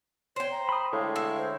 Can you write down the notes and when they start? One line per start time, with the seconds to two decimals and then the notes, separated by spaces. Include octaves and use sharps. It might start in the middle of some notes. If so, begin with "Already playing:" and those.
0.36 C5 C#5 G5
0.51 A#5
0.69 B5 D#6
0.93 A2 D3 G#3 F5
1.16 E4
1.38 C5